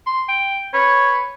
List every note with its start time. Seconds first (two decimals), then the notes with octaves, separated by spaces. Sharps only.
0.06 C6
0.28 G5
0.73 B4 C#5